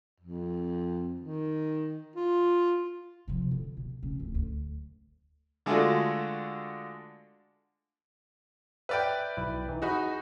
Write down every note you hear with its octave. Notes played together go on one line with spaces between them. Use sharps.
F2
D#3
F4
C3 F3
D3
B2
C#3 C#4
D1
D2
D3 G#3 A3 D4 F4 F#4
B4 D5 E5 G5 F6 B6
B1 E4
E3 D#4
D#4 F#4 G#4 B5